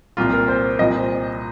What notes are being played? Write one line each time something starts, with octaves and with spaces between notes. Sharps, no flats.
C2 A#2 F3 F4
A#4
C5
C2 A#2 F3 D#5
C5